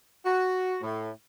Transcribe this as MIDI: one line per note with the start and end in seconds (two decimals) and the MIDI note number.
0.24 0.76 66
0.81 1.10 45